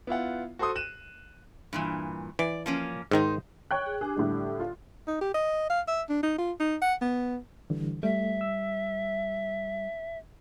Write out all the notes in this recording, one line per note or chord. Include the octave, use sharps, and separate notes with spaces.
B3 E4 F4 F#5
F#4 A4 C5 C6 D#6
F#6 D#7 E7
G2 A#2 E3
E3 D5
F3 A#3 C#4
G#2 D#3 D#4 C5
C#5 G5 F#6
G#4
D4 G4 G#4 D6
A2 D3 G3
F4
D#4
G4
D#5
F5
E5
D4
D#4
F4
D#4
F#5
B3
D3 E3 G3
G3 A3 E5
E6